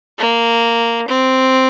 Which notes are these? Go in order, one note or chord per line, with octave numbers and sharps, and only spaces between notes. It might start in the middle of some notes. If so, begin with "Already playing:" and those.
A#3
C4